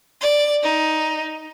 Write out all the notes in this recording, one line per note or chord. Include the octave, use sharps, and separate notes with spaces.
D5
D#4